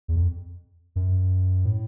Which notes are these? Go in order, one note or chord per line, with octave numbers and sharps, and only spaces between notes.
E2
F2
F#2
A2